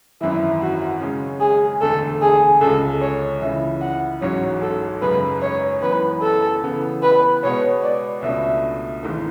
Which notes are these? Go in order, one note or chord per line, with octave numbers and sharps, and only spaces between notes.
G#1 F#2 E3 E4
F#4
C#3 G#3 C#4
G#4
E1 D2 D3 A3 A4
G#4
C#2 C#3 G#3 A4
C#5
C#2 C#3 E3 E5
F#5
A1 G#2 F#3 C#4 F#4 C#5
A4
F#2 C#3 G#3 B4
C#5
F#2 E3 B3 B4
A4
C#3 E3 B3
B4
B2 G#3 B3 C#5
D5
C#2 B2 A3 D4 E5
G#1 G#2 E3 A3